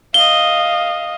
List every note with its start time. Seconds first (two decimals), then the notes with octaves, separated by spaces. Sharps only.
0.14 D#5 F5 G7